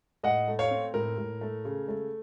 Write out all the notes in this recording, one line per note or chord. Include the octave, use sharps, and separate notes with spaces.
A2 D#5 F#5
A3
C#5 F5
C4
A2 A#4
A2
A3
C#3
A3